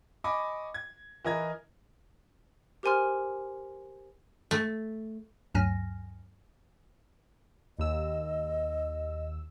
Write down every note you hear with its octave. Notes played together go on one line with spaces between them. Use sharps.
D#5 G#5 B5 C#6 D6
G#6
E3 A#4 D#5 A#5 G#6
G4 A#4 C5 G#5 C6 F6
A3
D2 G2 F#3 G#5 F6 A#6
D#2 D#5 E6